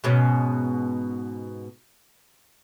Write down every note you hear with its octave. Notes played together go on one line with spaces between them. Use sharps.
G#2 B2 C#4